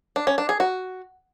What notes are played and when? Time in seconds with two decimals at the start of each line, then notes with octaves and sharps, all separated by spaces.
0.16 D4
0.27 C#4
0.38 D4
0.49 G#4
0.60 F#4